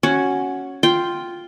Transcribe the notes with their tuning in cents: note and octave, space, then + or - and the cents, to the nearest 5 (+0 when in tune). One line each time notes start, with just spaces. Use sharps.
C#4 +0 F#4 +0
F4 +0 G5 +0